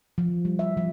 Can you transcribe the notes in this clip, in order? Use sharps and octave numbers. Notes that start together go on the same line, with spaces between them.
F3
G3
E5
F3